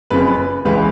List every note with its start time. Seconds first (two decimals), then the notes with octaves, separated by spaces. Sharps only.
0.10 F#1 F2 C#3 B4
0.65 C#2 C#3 E3 B4